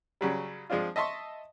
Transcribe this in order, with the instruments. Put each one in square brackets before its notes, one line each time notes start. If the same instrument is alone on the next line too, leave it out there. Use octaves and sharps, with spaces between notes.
[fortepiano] C#3 F#3 G3
F3 G#3 C4 D4 F4
D#5 E5 A5 C6 C#6